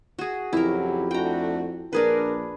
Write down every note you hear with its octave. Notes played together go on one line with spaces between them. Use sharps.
F#4 G#4
F2 C#3 F#3 E4 G4 A#4
A3 D4 F#4 G5 A#5
A#1 D4 G#4 A#4 B4